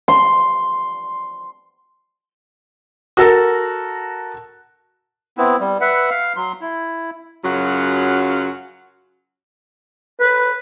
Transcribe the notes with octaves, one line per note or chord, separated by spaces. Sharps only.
C6
F#4 A4 A#4
B3 C4 E4
G3
B4 E5 F#5
F5
F#3 C6
E4
F#2 C#3 F#3 F4 F#4 F#5
B4